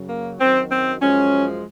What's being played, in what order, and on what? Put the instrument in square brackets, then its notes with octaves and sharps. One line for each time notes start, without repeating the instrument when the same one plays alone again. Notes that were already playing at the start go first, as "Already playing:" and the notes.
Already playing: [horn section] F#2 C#3 F#3
A#3
F#2 D#3 F#3 C4
C4
F#2 F3 G#3 C#4